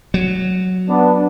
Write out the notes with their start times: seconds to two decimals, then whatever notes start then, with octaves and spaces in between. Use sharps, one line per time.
0.14 F#3
0.89 B3 D4